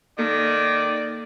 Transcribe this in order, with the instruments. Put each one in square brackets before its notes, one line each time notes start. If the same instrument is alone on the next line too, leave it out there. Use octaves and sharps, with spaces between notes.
[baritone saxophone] D#3 [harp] A#3 A4 [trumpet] D5